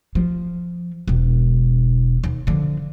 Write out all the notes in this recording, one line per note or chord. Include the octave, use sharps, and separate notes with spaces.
F3
E1 B2
D#2
D3 F3